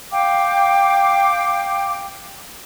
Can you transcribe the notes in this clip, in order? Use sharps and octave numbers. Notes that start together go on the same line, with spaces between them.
F5 G5 D6